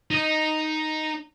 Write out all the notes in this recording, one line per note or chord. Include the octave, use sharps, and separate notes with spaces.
D#4 D#5